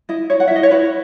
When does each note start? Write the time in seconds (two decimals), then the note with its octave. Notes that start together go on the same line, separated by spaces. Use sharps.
0.09 E4 D#5
0.30 E4 C#5
0.40 F#5
0.48 E5
0.51 E4 D#5
0.63 C#5
0.71 E4 B4